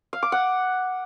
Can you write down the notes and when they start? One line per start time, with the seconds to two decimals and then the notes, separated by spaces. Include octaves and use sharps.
0.13 F5
0.23 D6
0.32 F#5